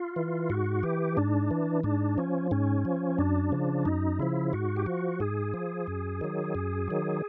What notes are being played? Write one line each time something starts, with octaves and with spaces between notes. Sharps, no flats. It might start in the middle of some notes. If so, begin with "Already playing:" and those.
Already playing: F4
E3
G#2 F#4
E3 G4
G#2 D4
E3
G#2 D4
F3 C#4
G#2 C#4
F3
F#2 D4
C#3 F3
F#2 D#4
C#3 F3 E4
G#2 F#4
G4
F3 F#4
G#2 G#4
F3
F#2
D#3 F#3
F#2
D#3 F#3